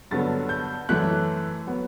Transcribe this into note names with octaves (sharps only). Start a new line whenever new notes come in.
G2 D3 F#3 B3 A6
G6
F#2 E3 A3 F#6
F#3 B3